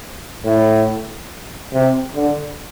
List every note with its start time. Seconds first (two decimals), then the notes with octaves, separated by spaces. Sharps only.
0.45 A2
1.73 C3
2.15 D3